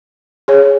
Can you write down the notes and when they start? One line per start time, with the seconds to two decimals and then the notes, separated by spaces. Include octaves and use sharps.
0.48 G#4 C#5